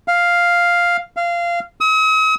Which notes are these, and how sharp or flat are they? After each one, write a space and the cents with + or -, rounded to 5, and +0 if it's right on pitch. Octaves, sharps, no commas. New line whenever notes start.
F5 +0
F5 -20
D#6 +45